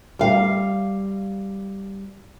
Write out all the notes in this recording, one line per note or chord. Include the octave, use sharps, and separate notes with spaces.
G3 F5